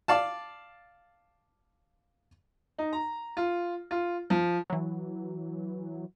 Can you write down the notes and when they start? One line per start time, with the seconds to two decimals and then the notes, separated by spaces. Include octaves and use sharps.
0.08 D5 F5 A5
2.78 D#4
2.93 A#5
3.37 F4
3.91 F4
4.30 F3
4.70 E3 F#3